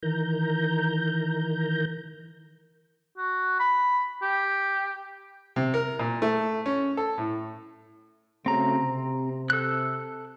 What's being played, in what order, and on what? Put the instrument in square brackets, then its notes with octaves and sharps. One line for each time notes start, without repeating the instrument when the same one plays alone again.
[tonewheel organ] D#3 E3 A#4 A#5 G6
[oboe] F#4
B5
G4
[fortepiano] C3
A#4
A#2
A3
C#4
A4
A2
[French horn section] C#3 A3 F#4 [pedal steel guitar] C4 A#5
[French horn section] C3
[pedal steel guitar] A4 F#6